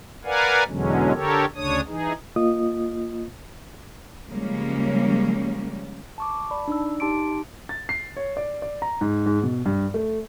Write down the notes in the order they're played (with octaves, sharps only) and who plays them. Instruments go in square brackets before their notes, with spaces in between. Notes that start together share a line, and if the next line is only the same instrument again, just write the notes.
[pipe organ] A#4 B4 D5 F5 F#5 G#5
E2 B2 D3 F#3 G#3 C#4
D3 G4 A4 A#4 C#5
D2 C#3 D4 C#5 D#6
E3 D#4 G#4
[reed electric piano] A#3 F4 D#5 D#6
[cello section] C#3 F3 G3 G#3 A#3 C#4
[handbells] A5 C#6 D6
D5 A5 B5
D4 D#4 D5 E6
D#4 G4 A5 C6 D6 D7
[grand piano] A6
C7
C#5
D5
D5
A#5
G#2
G#2
B2
G2
A3